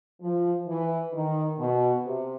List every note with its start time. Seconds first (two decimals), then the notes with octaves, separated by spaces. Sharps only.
0.22 F3
0.67 E3
1.13 D#3
1.58 B2
2.04 C3